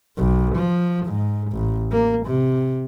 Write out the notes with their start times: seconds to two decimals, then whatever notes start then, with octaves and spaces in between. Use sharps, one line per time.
0.17 B1
0.56 F3
1.06 G#2
1.52 A1
1.91 A#3
2.26 C3